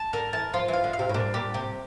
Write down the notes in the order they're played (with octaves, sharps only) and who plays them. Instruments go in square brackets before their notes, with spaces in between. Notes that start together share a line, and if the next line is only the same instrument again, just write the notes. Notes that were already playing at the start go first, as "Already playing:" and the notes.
Already playing: [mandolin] A5
[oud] D3 [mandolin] A#4
[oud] E3 [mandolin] A5
[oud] F3 [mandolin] F4
[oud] E3
[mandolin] F5
[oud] D3
[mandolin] F5
[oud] C3
A2
[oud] A#2 [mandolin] D4
[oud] A#2 [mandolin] G4
[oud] C3 [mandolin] G4